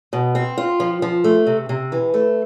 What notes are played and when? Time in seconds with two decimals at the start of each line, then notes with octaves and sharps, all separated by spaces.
0.13 B2
0.35 C4
0.58 F4
0.80 F3
1.02 F3
1.24 A3
1.47 C3
1.69 C3
1.92 E3
2.14 A3